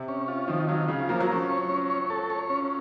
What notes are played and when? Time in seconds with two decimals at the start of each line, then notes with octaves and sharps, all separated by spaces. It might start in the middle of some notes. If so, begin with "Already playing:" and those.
Already playing: C3
0.08 C#4
0.28 F4
0.48 D#3 F3
0.68 F#3 F4
0.88 C#3 F4
1.09 F3 A#3
1.20 F#3
1.29 F3 C#4
1.49 C#5
1.69 C#4
1.90 C#5
2.10 A4
2.30 C#5
2.50 C#4